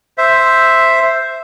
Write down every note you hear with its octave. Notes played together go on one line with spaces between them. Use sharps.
C5 E5